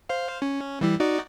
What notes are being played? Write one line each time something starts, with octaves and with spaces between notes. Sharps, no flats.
C5 F5
C#4
E3 G3 E4
D#4 F#4 D5